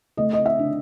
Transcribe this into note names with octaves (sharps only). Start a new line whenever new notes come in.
A3 D#5
D#5
E5
D4